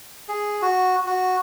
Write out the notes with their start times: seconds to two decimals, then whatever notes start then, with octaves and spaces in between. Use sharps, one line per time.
0.29 G#4
0.62 F#4
1.07 F#4